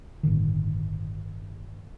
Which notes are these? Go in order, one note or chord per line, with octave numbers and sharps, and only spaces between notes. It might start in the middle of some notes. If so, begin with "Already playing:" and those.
G1 A2 D3 D#3